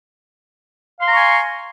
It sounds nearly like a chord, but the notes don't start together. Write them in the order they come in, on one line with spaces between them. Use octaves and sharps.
F5 C6 A#5 C#6 G#5